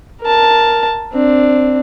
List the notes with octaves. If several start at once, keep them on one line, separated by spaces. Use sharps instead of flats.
A#4 A5
C4 D4